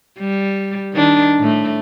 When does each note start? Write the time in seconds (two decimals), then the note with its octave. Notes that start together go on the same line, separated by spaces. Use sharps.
0.20 G3
0.93 D#3 D4
1.40 A2 A3